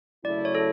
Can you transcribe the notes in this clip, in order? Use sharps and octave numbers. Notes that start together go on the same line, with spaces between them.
F#2 C#3 F#3 A3 E4 D5
C#5
A4